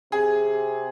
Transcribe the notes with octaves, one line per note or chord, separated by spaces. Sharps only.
C3 G#4